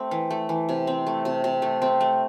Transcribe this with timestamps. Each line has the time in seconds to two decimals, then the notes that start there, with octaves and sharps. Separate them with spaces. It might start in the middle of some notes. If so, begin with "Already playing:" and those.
Already playing: A3 C4 G4
0.11 E3
0.30 A3
0.49 E3
0.69 C3
0.87 C4
1.07 A3
1.25 C3
1.44 C3
1.62 A3
1.82 C4
2.01 A3